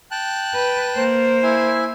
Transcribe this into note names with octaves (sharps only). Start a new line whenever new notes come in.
G5 A5 F#6
B4
A#3 C5
E4 G#5